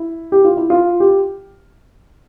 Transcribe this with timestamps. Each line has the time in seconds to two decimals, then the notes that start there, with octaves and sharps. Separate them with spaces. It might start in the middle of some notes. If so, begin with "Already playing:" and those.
Already playing: E4
0.32 G4
0.45 F4
0.57 E4
0.70 F4
1.00 G4